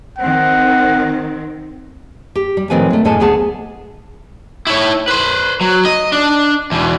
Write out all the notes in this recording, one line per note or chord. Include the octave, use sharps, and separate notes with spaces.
D#3 C4 F#5
G4
G3
A2 D#3 F3 C4 B4 G#5
G#3 A3
D2 A2 G#3 A4 G#5 A5
D2 B3 G#4 F#5 A5
E4 C#5
B4 C5
F#3
D#5
D4
E2 B2